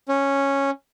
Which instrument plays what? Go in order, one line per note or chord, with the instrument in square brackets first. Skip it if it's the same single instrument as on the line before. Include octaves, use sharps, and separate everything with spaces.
[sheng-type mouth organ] C#4